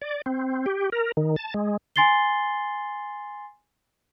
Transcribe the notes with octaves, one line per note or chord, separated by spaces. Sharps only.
D5
C4
G4
A#4
D#3
A5
G#3
G#5 C6 A6 C7 G7